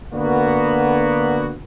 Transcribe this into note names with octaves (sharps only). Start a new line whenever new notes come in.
D3 A#3 B3 F#4